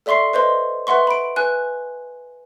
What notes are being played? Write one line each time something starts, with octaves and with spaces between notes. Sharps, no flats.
A4 D5 E5 C6 C#6 C7
B4 C5 D#5 C6
B4 E5 F#5 C6 C#6
B5 D7
B4 G#5 F#6